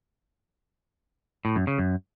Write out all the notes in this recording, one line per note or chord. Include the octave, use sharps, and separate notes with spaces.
A2
F#2
C#3
F#2